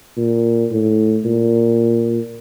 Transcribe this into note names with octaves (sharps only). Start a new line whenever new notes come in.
A#2
A2
A#2